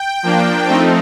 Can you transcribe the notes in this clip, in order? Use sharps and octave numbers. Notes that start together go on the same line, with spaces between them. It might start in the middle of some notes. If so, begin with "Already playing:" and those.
Already playing: G5
F3 A#3 D4
F3 A3 C4 D#4